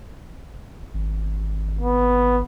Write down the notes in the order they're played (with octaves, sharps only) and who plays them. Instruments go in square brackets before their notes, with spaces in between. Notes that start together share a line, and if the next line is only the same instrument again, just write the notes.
[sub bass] G#1
[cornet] B3